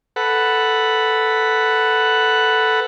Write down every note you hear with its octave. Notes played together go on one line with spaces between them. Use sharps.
A4 B4 F#5